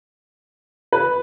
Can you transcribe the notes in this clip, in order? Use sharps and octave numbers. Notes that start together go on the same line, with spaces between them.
B4